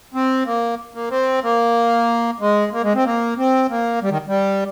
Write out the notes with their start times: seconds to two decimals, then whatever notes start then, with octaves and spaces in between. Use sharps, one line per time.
0.14 C4
0.46 A#3
0.94 A#3
1.11 C4
1.43 A#3
2.40 G#3
2.72 A#3
2.83 G#3
2.95 C4
3.05 A#3
3.38 C4
3.70 A#3
4.02 G3
4.11 D#3
4.28 G3